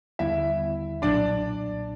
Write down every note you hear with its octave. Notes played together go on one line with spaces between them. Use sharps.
D#2 D3 G3 B3 E4 E5
B1 A#2 F#3 D4 D5